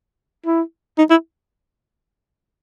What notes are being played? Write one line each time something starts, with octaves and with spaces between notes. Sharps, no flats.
E4
D#4
E4